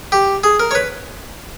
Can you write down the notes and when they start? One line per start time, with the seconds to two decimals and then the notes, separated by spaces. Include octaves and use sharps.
0.12 G4
0.44 G#4
0.60 A#4
0.71 C#5
0.75 B4